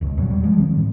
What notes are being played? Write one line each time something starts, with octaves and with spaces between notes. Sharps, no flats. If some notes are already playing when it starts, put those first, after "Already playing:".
E1 C#2
E2 A#2 F#3
G3
E3 F3 G3 G#3
D#3 C4
A2 E3